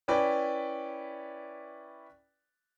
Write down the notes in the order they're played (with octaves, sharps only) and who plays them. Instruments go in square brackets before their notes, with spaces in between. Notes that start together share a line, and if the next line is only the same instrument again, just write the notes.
[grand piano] C#4 E4 B4 D5 G5